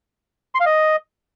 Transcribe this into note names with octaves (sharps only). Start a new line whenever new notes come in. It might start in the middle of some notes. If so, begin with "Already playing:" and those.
C6
F5
D#5